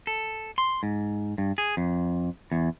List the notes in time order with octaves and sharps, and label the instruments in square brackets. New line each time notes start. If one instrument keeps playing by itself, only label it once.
[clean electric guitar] A4
C6
G#2
G2
G#4
F2
E2